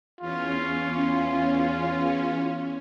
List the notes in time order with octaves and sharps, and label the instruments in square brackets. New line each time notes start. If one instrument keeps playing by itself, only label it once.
[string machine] E2 C#4 [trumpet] F4